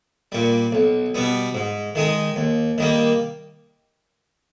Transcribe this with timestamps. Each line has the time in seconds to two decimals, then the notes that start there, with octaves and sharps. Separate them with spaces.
0.32 A#2 G3
0.72 B1
1.15 B2 G3 B3
1.55 G#2
1.95 D#3 G#3 D#4
2.36 D#2
2.78 D#3 G3 A#3